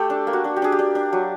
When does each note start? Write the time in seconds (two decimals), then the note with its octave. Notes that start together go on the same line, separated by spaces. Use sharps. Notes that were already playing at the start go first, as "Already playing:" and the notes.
Already playing: A3 G4 A4
0.10 D4
0.27 A#3
0.33 F#4
0.44 D4
0.56 G4
0.62 D4 G#4
0.72 G4
0.79 D4
0.95 D4
1.13 F#3